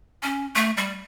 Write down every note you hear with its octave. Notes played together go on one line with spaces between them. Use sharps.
C#4
A3
G3